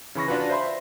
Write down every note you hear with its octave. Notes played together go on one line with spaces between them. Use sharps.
C#3 E3 B5 C#6 A#6
D4 F4 F#4 B4
C5 E5 B5 C6